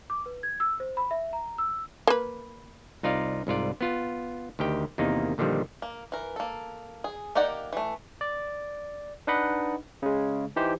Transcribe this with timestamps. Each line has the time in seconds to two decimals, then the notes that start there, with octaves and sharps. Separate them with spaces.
0.10 D6
0.26 B4
0.43 G#6
0.60 E6
0.80 C5
0.97 B5
1.11 E5
1.33 A#5
1.58 E6
2.07 A#3 B4
3.03 C2 D#4 F4 D5 F5
3.47 C2 G#2 F4 D5
3.81 B3 F4
4.59 D2 D#3 G4 G5
4.98 E2 C3 D#3 A#3 D#4
5.38 A#2 D3 D#3 F3 G3
5.82 A#3
6.12 E3 A#4
6.36 A#3 A4
7.04 G#4
7.35 A#3 D#4 G4 D5 F#5
7.72 E3 A3
8.21 D5
9.27 D4 D#4 B4 D#5 F#5 B5
10.02 C#3 G#3
10.56 E3 D#4 G4 C5